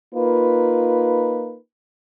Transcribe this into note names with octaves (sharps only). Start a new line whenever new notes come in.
A#3 D#4 F4 B4